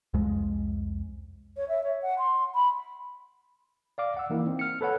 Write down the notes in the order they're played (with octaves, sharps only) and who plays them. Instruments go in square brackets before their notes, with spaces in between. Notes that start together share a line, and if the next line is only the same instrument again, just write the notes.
[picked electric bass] C2 F2 G#3
[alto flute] C#5
E5
C#5
F#5
C6
B5
[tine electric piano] D5 F5 D6
F#5 E6
E3 A#3 D#4 E4
C4
F6 C#7
A4 B4 C#5 F#5 A5